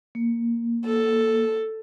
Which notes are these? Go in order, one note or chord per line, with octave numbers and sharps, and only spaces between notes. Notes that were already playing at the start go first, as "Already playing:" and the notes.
A#3
A4